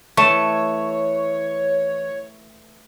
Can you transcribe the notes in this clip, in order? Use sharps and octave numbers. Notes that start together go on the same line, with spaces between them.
E3 A3 C#5 C#6 E7